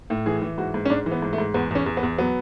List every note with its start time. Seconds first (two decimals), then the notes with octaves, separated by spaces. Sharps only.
0.10 A2
0.26 E3 G#4
0.42 E3
0.58 G#2 F#4
0.74 G#2
0.86 C#4
0.90 G#2 D4
1.06 E3
1.11 B3
1.22 G#2
1.33 A3
1.38 G#2
1.54 E2 B3
1.71 E2 C#4
1.86 E2
1.97 B3
2.03 E2
2.18 F#3 B3